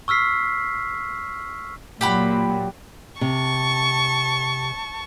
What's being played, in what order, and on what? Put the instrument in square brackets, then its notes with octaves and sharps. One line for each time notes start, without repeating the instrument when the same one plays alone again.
[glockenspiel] C#6 E6 F6 B6 C7
[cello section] A#2 F#3 [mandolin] G4 F#5 B5
[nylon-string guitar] C3 [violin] A5 C#6